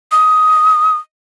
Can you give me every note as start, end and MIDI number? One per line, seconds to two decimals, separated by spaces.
0.12 0.96 87